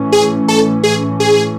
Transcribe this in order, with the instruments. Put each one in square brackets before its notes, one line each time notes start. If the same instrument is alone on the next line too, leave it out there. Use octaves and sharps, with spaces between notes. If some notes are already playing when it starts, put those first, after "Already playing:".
Already playing: [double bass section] A2 E3 A3 C#4
[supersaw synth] G#4
A4
G#4
G#4